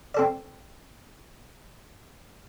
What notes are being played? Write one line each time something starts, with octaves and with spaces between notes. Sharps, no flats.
C4 A4 D5